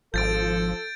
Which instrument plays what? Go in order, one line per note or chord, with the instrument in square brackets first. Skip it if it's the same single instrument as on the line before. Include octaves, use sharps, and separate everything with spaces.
[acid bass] G#1 [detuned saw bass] F3 [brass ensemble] A4 [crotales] G6 A6 D7